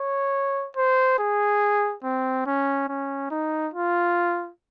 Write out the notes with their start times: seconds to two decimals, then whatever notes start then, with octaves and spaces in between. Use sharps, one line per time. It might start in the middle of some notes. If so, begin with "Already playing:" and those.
Already playing: C#5
0.77 C5
1.19 G#4
2.04 C4
2.46 C#4
2.89 C#4
3.31 D#4
3.74 F4